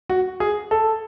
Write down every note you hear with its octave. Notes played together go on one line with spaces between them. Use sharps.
F#4
G#4
A4